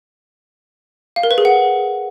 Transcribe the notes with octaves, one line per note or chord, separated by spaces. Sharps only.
F5
A#4
B4
G#4
F#5